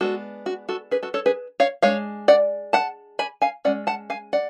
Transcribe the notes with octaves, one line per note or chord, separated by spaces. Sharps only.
G#3 B3 D4 F#4 A4
F#4
F#4 A4
G#4 B4
F#4 A4
A4 C#5
G#4 B4
C#5 F5
G#3 D4 C#5 F5
D5 F#5
F#5 A5
G#5 B5
F5 G#5
G#3 C#4 D5 F#5
F#5 A5
F5 G#5
D5 F#5